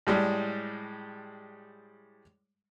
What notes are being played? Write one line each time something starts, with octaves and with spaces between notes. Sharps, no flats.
A2 G3 G#3